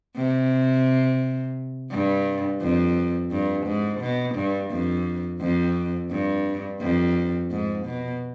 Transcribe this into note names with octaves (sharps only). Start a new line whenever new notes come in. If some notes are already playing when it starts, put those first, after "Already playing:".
C3
G2
F2
G2
G#2
B2
G2
F2
F2
G2
F2
G#2
B2